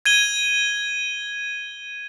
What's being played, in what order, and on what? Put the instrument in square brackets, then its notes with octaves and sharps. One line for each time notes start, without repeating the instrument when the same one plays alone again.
[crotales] G#6 D#7 G7